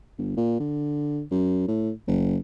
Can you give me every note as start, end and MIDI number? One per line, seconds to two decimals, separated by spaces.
0.19 0.36 31
0.37 0.56 46
0.60 1.22 50
1.31 1.66 42
1.68 1.92 45
2.08 2.38 30